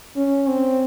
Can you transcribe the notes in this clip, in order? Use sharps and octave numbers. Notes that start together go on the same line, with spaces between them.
C#4
C4